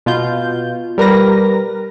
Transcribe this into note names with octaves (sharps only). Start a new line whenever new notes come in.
B2 F4 G6
G3 A#4 B4 A#6